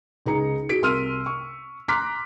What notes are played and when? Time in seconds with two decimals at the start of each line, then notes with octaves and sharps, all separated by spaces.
0.26 C#2 D#4 G#4 A#5 C#7
0.69 F#4 G#4 B6 D7
0.82 C2 A#4 C6 E6 F6 D#7
1.26 C#6
1.88 A#5 C6 D6 F6 F#6 B6